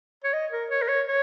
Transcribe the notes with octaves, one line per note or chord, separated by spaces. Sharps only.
C#5
D#5
A#4
C#5
A#4
C#5
C#5